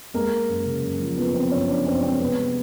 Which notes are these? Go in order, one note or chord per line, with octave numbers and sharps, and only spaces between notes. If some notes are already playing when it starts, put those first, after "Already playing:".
G#3 A#3 A#4
G#3
F#2
C#3
F#2
F3
F3 B3 B4
F3 C4 C5
F#2 C#4 C#5
F3 D4 D5
F#2 C4 C5
C#5
G#3 C4 C5
C3 B3 B4
G3